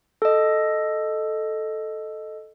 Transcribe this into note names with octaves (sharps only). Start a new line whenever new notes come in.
A4 D#5